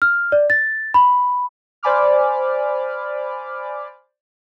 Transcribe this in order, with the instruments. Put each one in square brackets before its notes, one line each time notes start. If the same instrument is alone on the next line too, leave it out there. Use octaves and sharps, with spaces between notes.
[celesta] F6
D5
A6
B5
[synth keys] C5 D5 G#5 B5 D6 F6